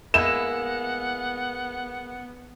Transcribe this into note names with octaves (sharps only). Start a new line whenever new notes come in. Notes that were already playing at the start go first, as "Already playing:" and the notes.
G#3 A#3 B3 E4 F#5 E7